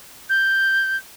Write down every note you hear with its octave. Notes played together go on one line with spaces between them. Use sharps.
G6